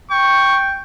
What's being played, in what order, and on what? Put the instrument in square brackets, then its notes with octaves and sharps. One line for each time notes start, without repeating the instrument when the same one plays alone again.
[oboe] G5 [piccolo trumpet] C#6